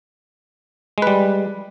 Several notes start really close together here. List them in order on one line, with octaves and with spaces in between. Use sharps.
G#3 B4 G3